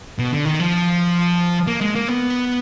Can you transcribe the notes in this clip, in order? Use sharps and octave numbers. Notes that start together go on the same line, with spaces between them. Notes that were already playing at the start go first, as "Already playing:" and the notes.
B2
D3
D#3
F3
A#3
G#3
A#3
B3